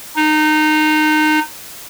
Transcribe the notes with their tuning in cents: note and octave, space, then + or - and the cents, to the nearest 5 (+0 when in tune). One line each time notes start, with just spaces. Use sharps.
D#4 -20